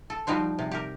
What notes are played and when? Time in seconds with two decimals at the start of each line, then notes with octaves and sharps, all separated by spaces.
0.10 A4
0.27 F3 G3 D#4 F#4 C5
0.59 C3
0.71 G4 A#4